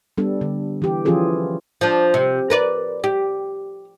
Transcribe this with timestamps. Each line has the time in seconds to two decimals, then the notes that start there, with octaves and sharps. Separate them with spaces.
0.18 G3 B3 D4 A4
0.41 D3
0.82 E3 G4
1.05 E3 F3 C#4 F4 G#4 A4
1.81 F3 D4
2.14 C3
2.50 A#4 B4 D5
3.04 G4